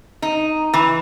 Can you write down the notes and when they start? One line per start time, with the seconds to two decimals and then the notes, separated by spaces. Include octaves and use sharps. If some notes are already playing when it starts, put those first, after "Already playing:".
0.22 D#4
0.74 E3